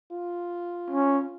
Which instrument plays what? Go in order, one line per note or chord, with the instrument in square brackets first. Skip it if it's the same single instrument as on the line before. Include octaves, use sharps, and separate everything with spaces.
[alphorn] F4
[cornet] C#4